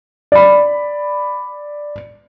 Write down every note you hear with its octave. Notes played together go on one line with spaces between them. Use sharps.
D5 B5